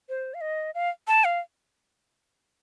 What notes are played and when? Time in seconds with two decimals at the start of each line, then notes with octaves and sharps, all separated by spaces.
0.09 C5
0.34 F5
0.41 D#5
0.75 F5
1.08 A5
1.24 F5